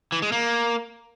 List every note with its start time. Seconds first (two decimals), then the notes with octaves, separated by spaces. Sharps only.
0.12 E3
0.22 G#3
0.32 A#3